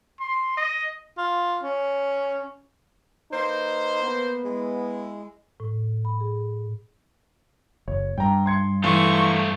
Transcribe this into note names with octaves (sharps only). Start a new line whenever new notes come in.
C6
D#5
F4
C#4
A#3 D#4 B4 C5
B3
G#3 E4
A2
B5
G#4
F#1 C#5
G2 G5 A#5
C6 G#6 C#7
E3 A3 F4 C#6